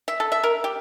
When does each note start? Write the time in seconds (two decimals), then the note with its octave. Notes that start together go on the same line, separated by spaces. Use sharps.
0.08 E5
0.20 A4
0.32 E5
0.43 A#4
0.64 G4